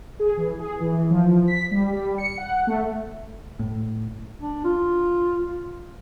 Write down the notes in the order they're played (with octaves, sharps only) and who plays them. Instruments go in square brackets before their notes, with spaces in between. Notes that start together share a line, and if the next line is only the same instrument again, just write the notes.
[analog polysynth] G#4
E3
G#4
E3
E3
F3
B6
G3
G3
C#7
F#5
A3
[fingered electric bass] A2
[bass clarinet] D4
F4